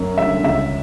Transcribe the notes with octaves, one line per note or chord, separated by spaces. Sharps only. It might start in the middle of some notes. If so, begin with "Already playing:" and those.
Already playing: F#2
D3 G3 E5
C#2 E5